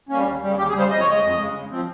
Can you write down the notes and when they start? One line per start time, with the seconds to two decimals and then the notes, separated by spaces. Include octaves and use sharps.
0.09 G3 A#3 C#4
0.25 D#2
0.42 C#3 G3
0.58 D#2 G4
0.69 G#4
0.74 C#3 G3
0.79 C5
0.90 F2 D#5
1.00 C#5
1.06 C#3 G#3 D#5
1.22 F2
1.38 C#3 G#3
1.55 C#3
1.71 F3 C4